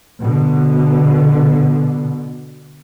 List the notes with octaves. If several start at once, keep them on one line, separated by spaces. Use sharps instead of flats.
B2 D3